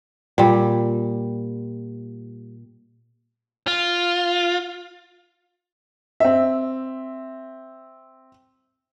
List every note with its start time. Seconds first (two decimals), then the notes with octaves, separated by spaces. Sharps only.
0.38 A#2 G3
3.67 F4
6.20 C4 E5